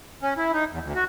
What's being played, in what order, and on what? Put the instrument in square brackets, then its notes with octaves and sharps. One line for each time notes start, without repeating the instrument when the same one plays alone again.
[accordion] C#4
E4
D#4
E2
D2
F#4